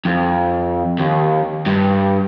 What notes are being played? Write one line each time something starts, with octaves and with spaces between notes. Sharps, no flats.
F2
D#2
G2